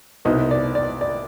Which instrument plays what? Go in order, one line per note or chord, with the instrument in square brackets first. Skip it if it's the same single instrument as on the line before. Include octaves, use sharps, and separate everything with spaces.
[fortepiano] C2 B2 B3 D#4
D5
D5
D5